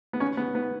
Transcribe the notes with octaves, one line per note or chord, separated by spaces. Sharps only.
B3
C#4
B3
B3